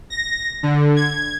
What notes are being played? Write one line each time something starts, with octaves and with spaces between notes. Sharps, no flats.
A#6
D3
G#6